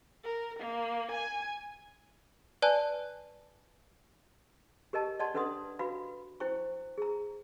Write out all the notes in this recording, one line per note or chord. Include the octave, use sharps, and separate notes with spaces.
A#4
A#3
G#5
B4 D5 G#5 A5 F#6
G4 A#4 D#5 A5
D5 D#5 F#5 A5 C6
D4 A4 B4 F#5 C6 D#6
F#4 B4 F5 B5
E4 C5 G5 C#6
G#4 A#5